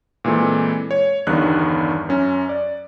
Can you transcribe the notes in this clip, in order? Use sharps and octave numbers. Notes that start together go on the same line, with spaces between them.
A#2 E3 G#3 C4 A4
C#5
G1 E2 G2 D#3 F#6
F#2 C#4
D5